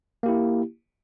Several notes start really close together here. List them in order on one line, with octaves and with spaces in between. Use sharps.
A#3 G4 E4